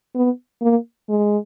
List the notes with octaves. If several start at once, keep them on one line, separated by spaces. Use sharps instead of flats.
B3
A#3
G#3